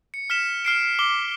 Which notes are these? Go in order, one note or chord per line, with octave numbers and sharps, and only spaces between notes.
C#7
F6 B6 E7
F6 C7 D7
D6 G7